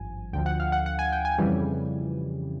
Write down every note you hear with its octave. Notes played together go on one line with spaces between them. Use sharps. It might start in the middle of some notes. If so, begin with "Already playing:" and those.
Already playing: G#1 G2 F3 G#5
D2 D3 F3 G5
F#5
F5
F#5
F#5
G#5
G5
G#5
F2 C#3 E3 G3